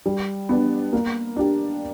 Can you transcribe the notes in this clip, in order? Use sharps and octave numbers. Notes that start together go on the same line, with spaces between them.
G3
B3 D4
A#3
D4 G4